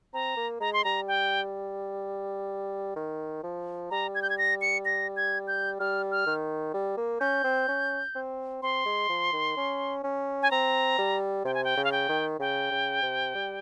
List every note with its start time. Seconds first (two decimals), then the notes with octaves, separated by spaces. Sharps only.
0.14 C4 A#5
0.37 A#3
0.60 G#3 A#5
0.73 C6
0.84 G3 A#5
1.08 G5
2.96 D#3
3.43 F3
3.91 G3 A#5
4.15 G#6
4.22 G6
4.30 G#6
4.38 A#6
4.61 C#7
4.85 A#6
5.17 G#6
5.48 G6
5.80 G3 F6
6.11 F6
6.26 D#3
6.74 G3
6.97 A#3
7.20 C#4 G6
7.44 C4
7.68 C#4
8.15 C4
8.62 C4 C6
8.85 G#3
9.09 F3
9.32 D#3
9.57 C#4
10.04 C#4
10.42 G#5
10.51 C4 A#5
10.98 G3
11.45 C3 G5
11.54 G#5
11.64 G5
11.77 C#3
11.85 F5
11.92 G5
12.09 D#3
12.39 C#3 G5
12.71 C#3
13.02 C3
13.35 G3